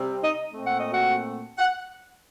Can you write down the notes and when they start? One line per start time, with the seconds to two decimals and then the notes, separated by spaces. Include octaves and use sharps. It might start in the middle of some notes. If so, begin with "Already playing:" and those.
Already playing: C3 G3 C4
0.23 D#4 D#5
0.51 A#2 A3 C4
0.65 F#5
0.79 D#5
0.93 F#4 F#5
1.58 F#5